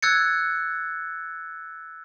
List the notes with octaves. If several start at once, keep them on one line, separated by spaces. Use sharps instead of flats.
E6 F#6 G#6 A6 C#7